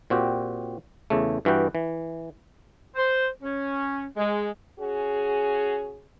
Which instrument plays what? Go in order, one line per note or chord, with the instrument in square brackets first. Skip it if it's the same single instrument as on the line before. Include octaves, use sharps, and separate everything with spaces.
[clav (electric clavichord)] A#2 C4 F#4 G4
E2 C#3 A3
G2 E3 F#4 B4 G5
E3
[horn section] C5
C#4
G#3
[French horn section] C#4 F#4 G#4